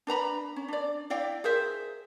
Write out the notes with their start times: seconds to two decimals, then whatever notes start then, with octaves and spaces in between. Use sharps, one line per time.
0.07 D4 B4 A#5 B5
0.56 C#4
0.68 D4 D5
1.10 E4 D5 F5 G5
1.44 G#4 A#4 C5 E5